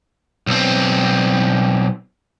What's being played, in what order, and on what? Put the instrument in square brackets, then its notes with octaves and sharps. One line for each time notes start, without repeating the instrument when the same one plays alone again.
[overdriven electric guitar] B1 C4